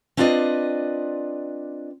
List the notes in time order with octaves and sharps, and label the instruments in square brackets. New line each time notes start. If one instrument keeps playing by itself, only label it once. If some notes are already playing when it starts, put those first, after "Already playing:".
[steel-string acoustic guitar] C4 D4 F4 B4 D5 D#5